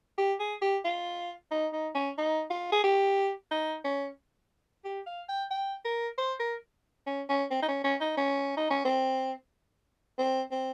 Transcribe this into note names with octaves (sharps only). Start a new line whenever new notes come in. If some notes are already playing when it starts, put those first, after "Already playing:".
G4
G#4
G4
F4
D#4
D#4
C#4
D#4
F4
G#4
G4
D#4
C#4
G4
F5
G5
G5
A#4
C5
A#4
C#4
C#4
C4
D#4
C#4
C#4
D#4
C#4
D#4
C#4
C4
C4
C4